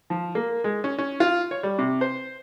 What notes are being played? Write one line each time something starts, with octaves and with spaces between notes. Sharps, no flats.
F3
A#3
G#3
C#4
C#4
F4
C#5
G3
C3
C5